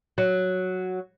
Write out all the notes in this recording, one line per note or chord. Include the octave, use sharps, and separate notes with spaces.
F#3